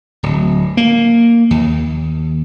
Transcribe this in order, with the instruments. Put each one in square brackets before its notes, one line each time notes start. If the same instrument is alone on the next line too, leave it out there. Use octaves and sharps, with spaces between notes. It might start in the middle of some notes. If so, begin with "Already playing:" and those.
[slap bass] D1
A#3
D#2